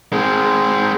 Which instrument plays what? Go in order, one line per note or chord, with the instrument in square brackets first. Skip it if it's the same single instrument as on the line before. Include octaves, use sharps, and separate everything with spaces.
[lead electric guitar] G#3 C4